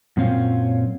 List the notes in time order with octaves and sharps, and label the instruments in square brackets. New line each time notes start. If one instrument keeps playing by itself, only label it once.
[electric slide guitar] F#2 A#2 C4 C#4 F4